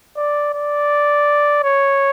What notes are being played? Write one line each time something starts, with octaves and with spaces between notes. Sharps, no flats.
D5
D5
C#5